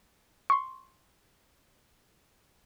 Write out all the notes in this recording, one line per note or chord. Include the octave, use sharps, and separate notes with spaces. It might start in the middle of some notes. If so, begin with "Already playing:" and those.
C6 C#6